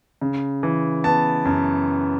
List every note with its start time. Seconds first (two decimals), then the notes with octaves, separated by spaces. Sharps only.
0.21 C#3
0.63 E3
1.04 B3 A5
1.45 F#2